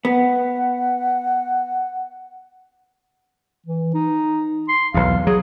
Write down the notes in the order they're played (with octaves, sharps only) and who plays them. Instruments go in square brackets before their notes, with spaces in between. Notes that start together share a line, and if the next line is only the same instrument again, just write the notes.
[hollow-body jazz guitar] B3 [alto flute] F#5
[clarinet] E3
D#4
C6
[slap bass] B1 E2 [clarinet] F5
[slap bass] F#3 [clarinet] G#4